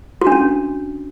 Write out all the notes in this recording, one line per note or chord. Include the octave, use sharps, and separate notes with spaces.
F#4
D4
C#4